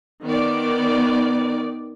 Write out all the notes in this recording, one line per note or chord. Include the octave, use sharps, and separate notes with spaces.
D#3 B3 D5